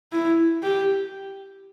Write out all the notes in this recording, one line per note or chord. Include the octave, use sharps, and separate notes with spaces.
E4
G4